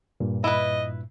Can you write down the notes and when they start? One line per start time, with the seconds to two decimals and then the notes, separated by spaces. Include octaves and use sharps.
0.20 G2 A#2
0.44 E4 B4 D#5